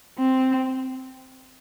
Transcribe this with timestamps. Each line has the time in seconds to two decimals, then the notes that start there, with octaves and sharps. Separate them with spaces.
0.19 C4